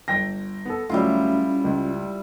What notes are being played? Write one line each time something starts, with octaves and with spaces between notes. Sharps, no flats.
G1 G5 A#6
B3 A4
D2 F#3 G3 C#4 E4 F4
C#2